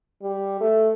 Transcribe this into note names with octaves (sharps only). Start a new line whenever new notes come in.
G3
A3